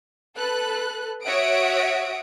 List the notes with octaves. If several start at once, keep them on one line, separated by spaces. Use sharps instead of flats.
A4 B4 F#6
F#4 C#5 E5 F#5 D#6 D7